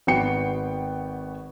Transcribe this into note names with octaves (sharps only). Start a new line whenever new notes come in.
G#1 B3 F#4 G5 C#7